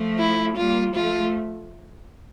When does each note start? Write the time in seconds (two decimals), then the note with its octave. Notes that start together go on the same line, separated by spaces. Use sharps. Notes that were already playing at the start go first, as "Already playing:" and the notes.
Already playing: F3 A3
0.18 E4
0.56 G3 A#3 F4
0.94 F3 A3 F4